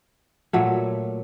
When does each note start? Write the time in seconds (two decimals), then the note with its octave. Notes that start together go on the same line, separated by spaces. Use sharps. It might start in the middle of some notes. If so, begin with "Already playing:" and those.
0.53 A#2 F#3 A3